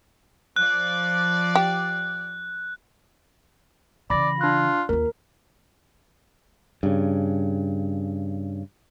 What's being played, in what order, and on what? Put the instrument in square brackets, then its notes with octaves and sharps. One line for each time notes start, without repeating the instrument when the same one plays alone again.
[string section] F3 D5 [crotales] F#6
[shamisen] G4
[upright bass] C#3 E3 [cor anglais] D5 [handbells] B5 A#6
[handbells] D4 F#6 [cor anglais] F4
[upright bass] D#2 F4 [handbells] A#4
[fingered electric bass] G2 C#3